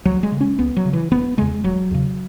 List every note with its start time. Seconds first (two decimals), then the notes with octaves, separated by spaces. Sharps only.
0.05 C#2 F#3
0.23 G#3
0.32 C#3
0.41 C#4
0.59 C#2 B3
0.76 F#3
0.85 C#3
0.93 E3
1.11 E1 B3
1.37 E2 C#3 G#3
1.64 E1 F#3
1.91 E2 C#3